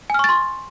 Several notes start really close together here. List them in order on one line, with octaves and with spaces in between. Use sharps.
G#5 F6 C#6 A6 C6